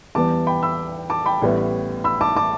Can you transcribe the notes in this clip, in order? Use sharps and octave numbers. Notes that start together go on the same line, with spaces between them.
E2 E3 G3 B3 A5 D6
G5 B5
B5 E6
A5 D6
G5 B5
A1 A2 G3 B3
B5 E6
A5 D6
A5 D6